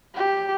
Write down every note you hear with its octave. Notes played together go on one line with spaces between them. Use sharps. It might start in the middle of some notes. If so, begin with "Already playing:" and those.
G4